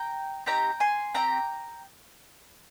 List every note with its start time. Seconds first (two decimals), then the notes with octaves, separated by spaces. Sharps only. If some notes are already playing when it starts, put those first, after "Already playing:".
Already playing: G5 A#5
0.46 C4 D#4 G4 G5 A#5
0.80 G#5 C6
1.14 C4 D#4 G4 G5 A#5